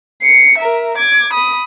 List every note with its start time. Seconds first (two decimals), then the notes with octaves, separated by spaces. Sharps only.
0.22 C7 C#7
0.58 A#4 E5
0.97 D6 G#6
1.33 B5 D#6